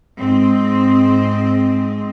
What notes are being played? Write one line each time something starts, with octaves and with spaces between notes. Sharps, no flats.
G#2 C4 D#5